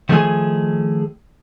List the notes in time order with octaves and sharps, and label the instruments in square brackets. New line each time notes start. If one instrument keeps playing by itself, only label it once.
[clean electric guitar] D#3 F3 A3 E4 G#4 G#5